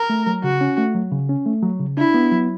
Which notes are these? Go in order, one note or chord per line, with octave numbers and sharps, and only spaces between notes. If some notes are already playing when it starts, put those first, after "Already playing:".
Already playing: A#4
A3
F#3
C#3 F#4
C#4
A3
F#3
C#3
C#4
A3
F#3
C#3
D4 E4
B3
F#3